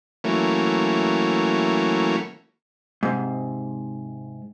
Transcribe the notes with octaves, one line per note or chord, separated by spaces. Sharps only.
E3 F#3 A3 A#3 C#4
G#2 C3